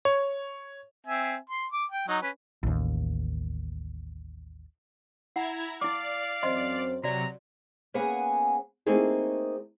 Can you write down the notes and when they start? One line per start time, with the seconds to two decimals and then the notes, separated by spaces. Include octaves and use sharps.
0.05 C#5
1.07 C4 E5 G#5
1.49 C6
1.72 D6
1.92 G5
2.08 F#3 D#4
2.22 C#4 B4
2.63 A1 D#2
5.36 E4 F#5 A#5 G#6
5.81 E4 D5 F5 D6
6.43 F#2 C4 C5 D#5 C6
7.03 C3 F#3 F#4 D5 A#5
7.94 A#3 B3 C#4 G#4 F#5 G#5
8.86 A3 A#3 C4 D#4 G#4